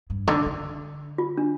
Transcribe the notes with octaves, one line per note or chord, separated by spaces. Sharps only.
G2
D3
D3
F4
D4